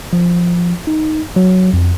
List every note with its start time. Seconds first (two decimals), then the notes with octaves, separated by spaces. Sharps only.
0.13 F3
0.87 D#4
1.36 F#3
1.73 F2